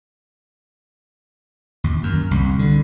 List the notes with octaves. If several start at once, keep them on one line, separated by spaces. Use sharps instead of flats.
D#2
F#2
C2
D3